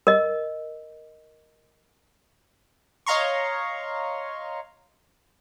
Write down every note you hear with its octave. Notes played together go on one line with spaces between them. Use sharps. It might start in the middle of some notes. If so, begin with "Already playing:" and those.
A#4 D#5
C#5 D#5 F5 A#5 C6 C#6